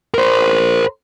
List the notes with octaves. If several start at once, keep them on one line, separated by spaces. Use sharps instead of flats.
A#4 C5